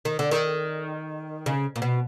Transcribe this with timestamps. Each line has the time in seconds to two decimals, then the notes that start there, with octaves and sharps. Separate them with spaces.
0.05 D#3
0.19 D3
0.31 D#3
1.46 C#3
1.76 A#2
1.82 B2